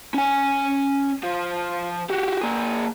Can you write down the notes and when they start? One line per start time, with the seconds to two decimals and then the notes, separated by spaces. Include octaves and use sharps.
0.14 C#4 G#5
1.23 F3
2.10 F#4 G4
2.41 A#3 G#4